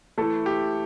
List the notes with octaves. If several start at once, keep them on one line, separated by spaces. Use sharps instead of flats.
E3 A3 E4 A4
G4